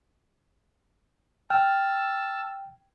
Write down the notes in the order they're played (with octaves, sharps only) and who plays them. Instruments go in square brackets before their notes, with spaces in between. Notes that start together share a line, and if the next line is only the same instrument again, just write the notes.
[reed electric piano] G5 [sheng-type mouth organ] A5 E6 [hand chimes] F6